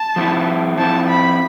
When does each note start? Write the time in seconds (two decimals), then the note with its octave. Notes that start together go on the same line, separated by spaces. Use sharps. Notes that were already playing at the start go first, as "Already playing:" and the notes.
Already playing: A5
0.16 F3 C4 E4
0.77 F3 C4 E4 A5
1.09 B5